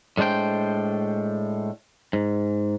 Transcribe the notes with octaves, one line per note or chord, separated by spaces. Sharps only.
A2 G#3 D4 C5 G5
G#2